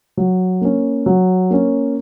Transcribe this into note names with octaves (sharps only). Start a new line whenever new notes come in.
F#3
A#3 C#4
F#3
A#3 C#4